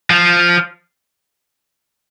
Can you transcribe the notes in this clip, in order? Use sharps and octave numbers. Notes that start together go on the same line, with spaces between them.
F3